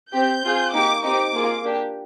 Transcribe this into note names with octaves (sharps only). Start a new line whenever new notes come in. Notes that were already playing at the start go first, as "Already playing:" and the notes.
C4 G4 G6
C4 F4 G#4
A#3 D#4 G4 D6
C4 D#4 G4 D6
A#3 F4 G#4
A#3 D4 G4